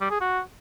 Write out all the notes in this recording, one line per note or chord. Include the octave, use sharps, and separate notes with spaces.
G3
G#4
F#4